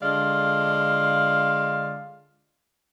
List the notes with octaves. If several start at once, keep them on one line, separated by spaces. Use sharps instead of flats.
D3 G#3 F4 D5 F5